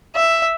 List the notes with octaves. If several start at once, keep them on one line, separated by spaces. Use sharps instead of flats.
E5